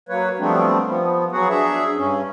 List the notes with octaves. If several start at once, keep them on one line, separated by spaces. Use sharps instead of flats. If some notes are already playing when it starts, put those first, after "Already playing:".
F#3 A#3 B4 C#5
F3 G3 A3 B3 C4 D4
F3 B3
F#3 B3 F#4 G#4 F#5
D4 G#4 E5
G2 C#4